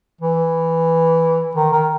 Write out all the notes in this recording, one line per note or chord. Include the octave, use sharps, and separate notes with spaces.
E3
D#3
D#3